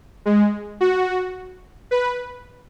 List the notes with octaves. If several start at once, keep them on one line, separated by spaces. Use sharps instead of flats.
G#3
F#4
B4